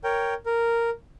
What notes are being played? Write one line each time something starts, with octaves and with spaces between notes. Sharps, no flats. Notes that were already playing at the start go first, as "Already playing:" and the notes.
A#4 C#5 G5
A#4